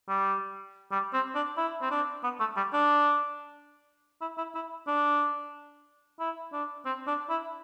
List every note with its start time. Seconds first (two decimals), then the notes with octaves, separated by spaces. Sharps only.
0.09 G3
0.92 G3
1.13 C4
1.35 D4
1.57 E4
1.82 C4
1.91 D4
2.24 B3
2.40 A3
2.57 G3
2.74 D4
4.21 E4
4.38 E4
4.55 E4
4.87 D4
6.20 E4
6.53 D4
6.86 C4
7.07 D4
7.30 E4